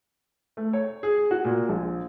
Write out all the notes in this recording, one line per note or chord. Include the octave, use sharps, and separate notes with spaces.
A3
C#5
G#4
F#4
A#2
A#1